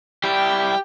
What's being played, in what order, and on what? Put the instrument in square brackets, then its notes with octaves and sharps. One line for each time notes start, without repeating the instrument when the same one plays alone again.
[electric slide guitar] G3 E4 [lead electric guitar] G4